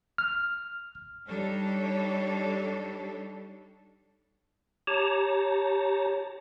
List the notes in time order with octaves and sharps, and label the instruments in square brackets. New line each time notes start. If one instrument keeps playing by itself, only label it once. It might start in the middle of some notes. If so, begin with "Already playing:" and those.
[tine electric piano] F6
[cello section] G3 D4 D#4 A4 C#5
[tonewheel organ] G4 C#5 A5 A#5